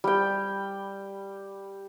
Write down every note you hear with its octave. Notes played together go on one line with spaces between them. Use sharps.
G3 G5